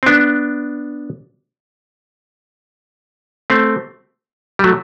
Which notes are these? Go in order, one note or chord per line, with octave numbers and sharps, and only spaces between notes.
C4
B3 D4
A3 C4
G3
F#3 A3